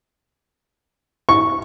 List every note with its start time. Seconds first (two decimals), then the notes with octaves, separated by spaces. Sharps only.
1.29 C#6